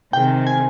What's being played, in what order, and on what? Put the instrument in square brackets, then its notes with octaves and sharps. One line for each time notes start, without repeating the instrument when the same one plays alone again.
[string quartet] C3 D#3 G#3 C4 [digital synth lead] G5
[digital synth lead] G#5